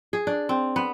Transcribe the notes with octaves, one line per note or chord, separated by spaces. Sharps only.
G#4
D4
C4
B3